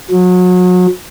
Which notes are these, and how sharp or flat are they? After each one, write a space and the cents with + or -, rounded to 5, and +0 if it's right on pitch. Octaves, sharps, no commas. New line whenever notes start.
F#3 -35